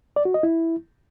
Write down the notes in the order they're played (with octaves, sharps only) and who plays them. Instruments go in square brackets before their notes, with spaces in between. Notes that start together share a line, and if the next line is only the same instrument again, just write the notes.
[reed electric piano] D5
F#4
D#5
E4